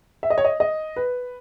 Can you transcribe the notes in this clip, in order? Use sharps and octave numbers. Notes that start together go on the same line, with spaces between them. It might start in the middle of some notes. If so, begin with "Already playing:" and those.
E5
D#5
C#5
D#5
D#5
B4